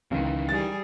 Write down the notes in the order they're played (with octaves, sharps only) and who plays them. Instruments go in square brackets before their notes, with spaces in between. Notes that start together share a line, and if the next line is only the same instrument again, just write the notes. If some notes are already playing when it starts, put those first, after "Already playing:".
[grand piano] C#2 [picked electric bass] D#3 E3
[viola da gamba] G3 G#4 [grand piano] A6